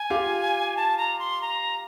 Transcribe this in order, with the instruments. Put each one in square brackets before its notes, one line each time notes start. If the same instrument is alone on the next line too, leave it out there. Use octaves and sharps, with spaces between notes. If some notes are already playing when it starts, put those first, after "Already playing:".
Already playing: [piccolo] G#5
[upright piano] F4 G4
[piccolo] A5
A#5
C6
A#5